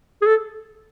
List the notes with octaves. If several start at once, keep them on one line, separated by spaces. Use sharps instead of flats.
G#4
A4